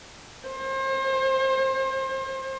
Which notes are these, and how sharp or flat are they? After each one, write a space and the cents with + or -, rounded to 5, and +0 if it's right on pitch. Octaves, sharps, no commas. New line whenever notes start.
C5 +35